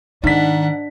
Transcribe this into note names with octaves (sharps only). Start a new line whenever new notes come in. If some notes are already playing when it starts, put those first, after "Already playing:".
G#2 D#3 D4 F#5 B6